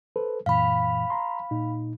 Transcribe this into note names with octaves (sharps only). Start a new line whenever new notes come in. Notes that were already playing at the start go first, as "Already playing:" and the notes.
A4 B4 C5
F#2 A#2 E3 F5 B5
A#5 C6
A#2 D#4